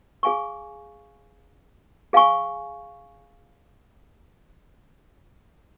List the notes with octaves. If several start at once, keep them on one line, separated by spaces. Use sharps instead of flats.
G#4 F5 G#5 C#6
G#4 F5 G#5 C#6